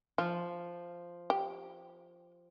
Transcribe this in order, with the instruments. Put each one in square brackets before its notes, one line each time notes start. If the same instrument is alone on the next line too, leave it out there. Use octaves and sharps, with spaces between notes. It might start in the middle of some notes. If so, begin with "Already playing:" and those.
[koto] F3 [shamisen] F4
[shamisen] G4